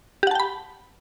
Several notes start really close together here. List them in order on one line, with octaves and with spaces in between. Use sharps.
G4 F#5 A5 G5 B5